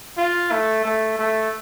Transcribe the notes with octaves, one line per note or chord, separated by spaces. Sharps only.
F4
A3
A3
A3